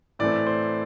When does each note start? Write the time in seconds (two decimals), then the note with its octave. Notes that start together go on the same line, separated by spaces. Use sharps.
0.19 A2 E3 A3 C4 D5
0.46 C5